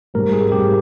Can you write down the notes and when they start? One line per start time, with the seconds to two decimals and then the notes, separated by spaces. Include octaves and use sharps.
0.14 G#2 G3 C4 A#4
0.33 G#4
0.52 G#2 G3 C4 G4